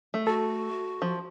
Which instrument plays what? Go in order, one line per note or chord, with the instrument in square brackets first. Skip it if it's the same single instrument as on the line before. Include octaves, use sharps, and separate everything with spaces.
[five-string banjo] A3
[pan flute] F#4 [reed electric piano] A4
[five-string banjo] F3